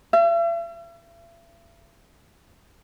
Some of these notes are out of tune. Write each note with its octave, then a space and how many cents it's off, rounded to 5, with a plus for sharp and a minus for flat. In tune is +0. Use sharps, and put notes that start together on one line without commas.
E5 +45